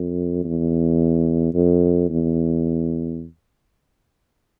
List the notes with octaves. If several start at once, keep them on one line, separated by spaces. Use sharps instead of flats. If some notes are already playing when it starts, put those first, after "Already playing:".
Already playing: F2
E2
F2
E2